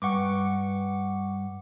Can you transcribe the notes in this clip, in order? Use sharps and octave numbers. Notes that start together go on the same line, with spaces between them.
G2 F#5 C#6 D6